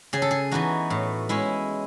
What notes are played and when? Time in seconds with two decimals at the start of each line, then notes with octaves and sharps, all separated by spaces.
0.13 C#3 G#4
0.22 A4
0.31 G#4
0.51 E3 B3 D#4 F#4
0.90 A2
1.29 G#3 C#4 E4